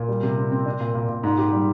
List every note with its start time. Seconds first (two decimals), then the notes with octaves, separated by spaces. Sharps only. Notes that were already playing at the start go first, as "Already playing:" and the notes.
Already playing: A#2
0.09 G3
0.23 C3
0.38 C4
0.52 C4
0.66 D4
0.80 A#2
0.95 A#2
1.09 A#2
1.24 G#2
1.38 G4
1.53 G3